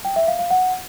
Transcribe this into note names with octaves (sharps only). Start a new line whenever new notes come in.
G5
E5
F5
F5
F#5